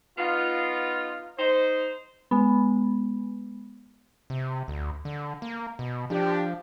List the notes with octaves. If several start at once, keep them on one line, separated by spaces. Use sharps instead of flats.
B3 D#4 F4
D#4 C5
G#3 B3
C3
D2
D3
A#3
B2
F3 D4 G4